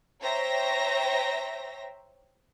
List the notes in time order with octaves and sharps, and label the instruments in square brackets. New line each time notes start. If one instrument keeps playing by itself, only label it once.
[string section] C5 C#5 E5 G5 A#5 A#6